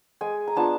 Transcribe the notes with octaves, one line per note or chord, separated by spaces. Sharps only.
G#3 G#5
A#5
B3 D4 F4 A5